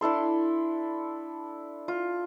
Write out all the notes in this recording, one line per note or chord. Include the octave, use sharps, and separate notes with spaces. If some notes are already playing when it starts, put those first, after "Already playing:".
D4 E4 A4 C6
F4